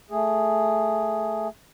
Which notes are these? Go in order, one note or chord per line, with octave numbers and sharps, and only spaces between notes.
A3 G#4